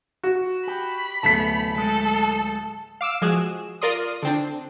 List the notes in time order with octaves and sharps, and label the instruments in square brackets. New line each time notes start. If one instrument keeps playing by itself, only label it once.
[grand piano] F#4
[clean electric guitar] G4 [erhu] B5
[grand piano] D1 A3 B6 [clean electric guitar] C2 B3 A5
[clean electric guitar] G#3 [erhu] A4
[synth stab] F5 D6 E6
F3 G#3 F#4 G#4 E7
F4 A#4 D5 C6 D#6
D3 C4 D4